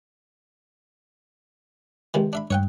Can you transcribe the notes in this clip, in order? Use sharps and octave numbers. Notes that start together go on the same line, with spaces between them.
C#2 C3 D#3
D4 E5 B5
G2 C#5 F#5 G5